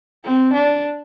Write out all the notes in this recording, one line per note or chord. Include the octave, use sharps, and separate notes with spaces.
C4
D4